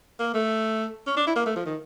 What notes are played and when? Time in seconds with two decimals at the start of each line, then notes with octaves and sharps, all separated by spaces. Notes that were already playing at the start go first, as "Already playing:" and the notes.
0.19 A#3
0.34 A3
1.07 C#4
1.17 D4
1.27 E4
1.36 A#3
1.46 A3
1.56 F3
1.65 D#3